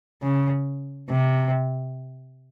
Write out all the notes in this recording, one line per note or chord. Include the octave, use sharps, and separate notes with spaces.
C#3
C3